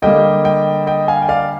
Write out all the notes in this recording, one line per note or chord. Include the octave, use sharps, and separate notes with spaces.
D3 G3 A#3 D#5 G5
D#5 G5
D#5 G5
F5 G#5
G5
D5 F5